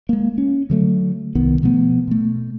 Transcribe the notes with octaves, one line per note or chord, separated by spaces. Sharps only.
G#3 A#3
C#4
D3 F#3 A3
C2 D#3 B3
B2 F3 A3 B3
B2 A3